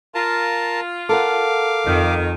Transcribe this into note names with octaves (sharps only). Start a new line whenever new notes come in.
F4 A#4 A5
A4 A#4 F5 F#5 D6
F2 D#3